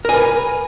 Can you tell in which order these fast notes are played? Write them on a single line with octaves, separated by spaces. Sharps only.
A#4 G#5 B4